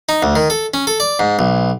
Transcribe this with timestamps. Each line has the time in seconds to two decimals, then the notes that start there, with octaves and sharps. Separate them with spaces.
0.09 D#4
0.23 D2
0.35 D#3
0.50 A4
0.74 C#4
0.87 A4
1.00 D5
1.19 G#2
1.39 B1